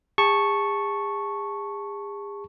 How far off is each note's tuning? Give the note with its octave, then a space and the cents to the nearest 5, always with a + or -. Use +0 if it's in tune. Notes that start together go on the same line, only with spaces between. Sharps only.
G#4 -40 A5 +0 C#6 -5